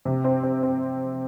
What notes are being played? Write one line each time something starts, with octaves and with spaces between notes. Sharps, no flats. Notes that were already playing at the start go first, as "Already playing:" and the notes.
C3
C4
C4
C4